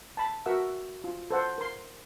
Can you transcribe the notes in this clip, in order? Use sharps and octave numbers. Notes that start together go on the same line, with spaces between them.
A5 B5
F#4 A#4 E5 F#5 E6
F4
A4 C5 F#5
A#4 C6